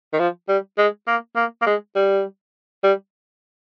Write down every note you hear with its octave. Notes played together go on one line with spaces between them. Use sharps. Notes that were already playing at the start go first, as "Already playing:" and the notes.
D#3
F3
G3
G#3
A#3
A#3
A#3
G#3
G3
G3